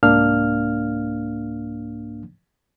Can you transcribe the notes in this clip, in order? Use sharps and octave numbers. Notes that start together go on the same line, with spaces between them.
C2 G#2 A#3 D4 F5 F6